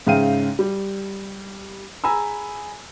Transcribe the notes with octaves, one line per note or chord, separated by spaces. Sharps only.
G#2 C#3 E5 F5 G5 D#7
G3
G#4 G#5 A#5 B5 E6